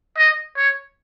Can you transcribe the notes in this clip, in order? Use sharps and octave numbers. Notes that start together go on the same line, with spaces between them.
D#5
C#5